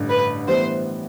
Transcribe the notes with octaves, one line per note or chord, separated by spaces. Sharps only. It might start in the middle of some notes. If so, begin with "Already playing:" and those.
Already playing: A1 G2 D3
B4
A2 E3 G3 B3 C5